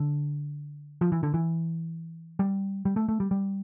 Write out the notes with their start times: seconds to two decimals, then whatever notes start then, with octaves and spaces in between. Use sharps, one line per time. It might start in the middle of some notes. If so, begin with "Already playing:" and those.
Already playing: D3
1.01 F3
1.12 E3
1.23 D3
1.34 E3
2.39 G3
2.85 G3
2.96 A3
3.09 A3
3.20 G3
3.31 G3